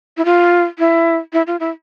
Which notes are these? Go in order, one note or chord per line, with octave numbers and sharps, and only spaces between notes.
E4
F4
E4
E4
F4
E4